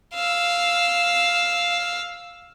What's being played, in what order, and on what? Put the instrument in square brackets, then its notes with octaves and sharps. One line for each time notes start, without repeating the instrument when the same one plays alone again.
[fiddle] F5 E6